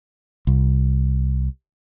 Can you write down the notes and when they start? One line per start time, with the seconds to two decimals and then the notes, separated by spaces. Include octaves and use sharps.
0.47 C2